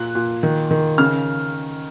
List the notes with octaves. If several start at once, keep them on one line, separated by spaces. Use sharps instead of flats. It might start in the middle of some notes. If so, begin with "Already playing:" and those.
Already playing: A#2 F#6
A#2
D#3
D#3
C#3 F6